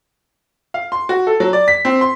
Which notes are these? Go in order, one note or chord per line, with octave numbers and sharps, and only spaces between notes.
F5
C6
F#4
A4
F#3
D5
B6
C4
C6